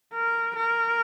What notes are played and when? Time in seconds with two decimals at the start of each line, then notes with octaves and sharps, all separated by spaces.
0.13 A#4
0.56 A#4